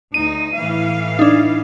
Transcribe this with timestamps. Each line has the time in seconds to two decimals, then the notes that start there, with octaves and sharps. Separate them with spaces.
0.14 D2 D#4 D#7
0.55 A2 E3 F5
1.19 D4 D#4